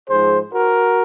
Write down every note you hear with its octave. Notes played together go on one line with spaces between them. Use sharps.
G#2 F3 G#3 G#4 C5
F#4 A#4